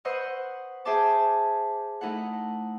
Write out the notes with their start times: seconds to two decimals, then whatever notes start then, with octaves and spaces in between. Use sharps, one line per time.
0.05 B4 C5 D#5 F#5 C#6 E6
0.85 G#4 C5 E5 G5 A5 D6
2.01 A3 D#4 E4 A4 F#5